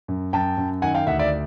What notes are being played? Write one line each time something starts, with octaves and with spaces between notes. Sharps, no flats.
F#2
F#2 G5 A5
F#2
D#3 F#5 G#5
F5 G5
D2 E5 F#5
D5 E5